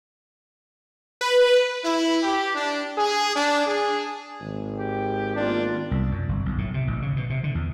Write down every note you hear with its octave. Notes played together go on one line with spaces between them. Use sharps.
B4
E4
G4
D4
G#4
D4
G#4
G#1
G4
A#3 B3 D4 F4
C2
F#2
G1
B1
A2
C3
A1
C#3
B2
C3
D3
E2